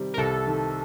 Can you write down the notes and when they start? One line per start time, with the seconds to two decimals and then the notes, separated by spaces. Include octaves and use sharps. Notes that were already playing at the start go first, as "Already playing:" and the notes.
Already playing: C3 D#3 G3
0.14 A#4
0.18 C2 A4
0.47 D#3